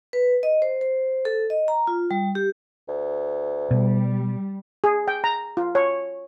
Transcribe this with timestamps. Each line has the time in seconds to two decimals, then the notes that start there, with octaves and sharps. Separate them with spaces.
0.13 B4
0.43 D#5
0.62 C5
0.81 C5
1.25 A4
1.50 D#5
1.68 A#5
1.87 F4
2.11 G3
2.35 G4
2.89 D2
3.71 B2 G3
4.84 G#4
5.08 G5
5.24 A#5
5.57 F4
5.75 C#5